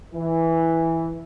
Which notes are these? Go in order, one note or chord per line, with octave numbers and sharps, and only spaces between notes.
E3